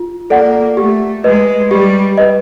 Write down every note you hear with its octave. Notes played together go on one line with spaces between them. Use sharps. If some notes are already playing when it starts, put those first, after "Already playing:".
Already playing: F4
A#3 A4 D5 F#5
A3 G4
G#3 B4 D#5
G3 G4
B4 D#5